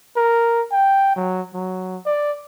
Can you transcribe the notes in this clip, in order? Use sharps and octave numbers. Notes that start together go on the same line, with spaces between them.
A#4
G5
F#3
F#3
D5